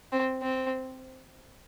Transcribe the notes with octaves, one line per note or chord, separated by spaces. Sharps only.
C4
C4